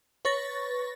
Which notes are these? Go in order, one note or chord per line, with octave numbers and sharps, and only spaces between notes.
B4 C#5 C#6 A6 A#6